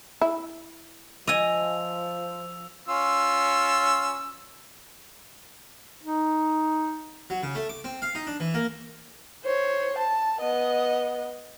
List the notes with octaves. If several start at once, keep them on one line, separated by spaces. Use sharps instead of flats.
E4
F3 D#5 G#5 E6 F7
C#4 F4 E6
D#4
F#3
C#3
A3
D6
C4
F5
D#4
D4
E3
A#3
C5 C#5
A5
B3 D#5